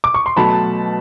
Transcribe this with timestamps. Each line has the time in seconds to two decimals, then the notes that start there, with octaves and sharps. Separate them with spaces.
0.04 D6
0.14 C#6
0.26 C6
0.37 B2 F#3 A3 A5 B5